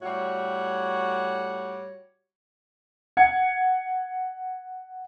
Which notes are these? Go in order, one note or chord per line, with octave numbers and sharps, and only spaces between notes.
A2 G3 F#4 C#5
F#5 G#6 C#7